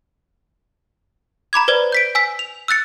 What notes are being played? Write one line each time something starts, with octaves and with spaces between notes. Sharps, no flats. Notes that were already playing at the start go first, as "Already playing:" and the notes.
A#5 B5 D6 G#6
B4 C5 D5 G#6
G6 B6 D7
G#5 E6 B6
F7
E6 F#6 A6 C#7